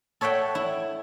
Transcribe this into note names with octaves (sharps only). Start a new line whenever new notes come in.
A4 C#5 E5 F#5 G5
E4